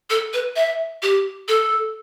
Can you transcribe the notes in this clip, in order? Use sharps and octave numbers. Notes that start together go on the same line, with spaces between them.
A4
B4
E5
G4
A4